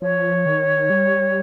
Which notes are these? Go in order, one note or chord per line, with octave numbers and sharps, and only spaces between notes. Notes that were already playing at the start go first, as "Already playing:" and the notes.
F3 C#5
D#3
G3